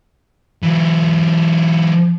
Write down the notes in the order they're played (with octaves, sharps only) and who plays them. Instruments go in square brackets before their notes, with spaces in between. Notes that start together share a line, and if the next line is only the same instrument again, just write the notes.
[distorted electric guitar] E3 F#3